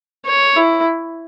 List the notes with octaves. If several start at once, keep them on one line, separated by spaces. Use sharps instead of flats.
C#5
E4